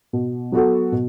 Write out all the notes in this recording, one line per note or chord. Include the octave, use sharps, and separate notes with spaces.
B2
F#3 B3 F#4 A4
B2